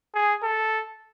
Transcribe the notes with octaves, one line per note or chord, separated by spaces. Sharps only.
G#4
A4